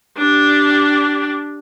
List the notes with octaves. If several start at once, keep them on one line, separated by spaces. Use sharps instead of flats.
D4 G4